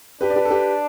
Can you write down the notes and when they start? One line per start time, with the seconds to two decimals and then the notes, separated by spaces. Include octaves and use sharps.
0.21 D4 G4 B4
0.30 D5
0.36 G4 B4
0.45 A4
0.50 G4 B4